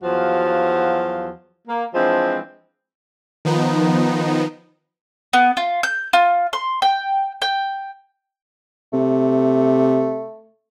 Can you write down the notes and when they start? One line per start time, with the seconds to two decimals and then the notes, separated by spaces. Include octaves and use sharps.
0.03 E2 F3 F#3 F#4 F5
1.68 A#3
1.94 E3 F3 G#3 C4 D4
3.45 D#3 F3 B3 D#4
5.33 B3
5.57 F4
5.83 G6
6.13 F4
6.53 C6
6.82 G5
7.42 G5
8.93 C3 A3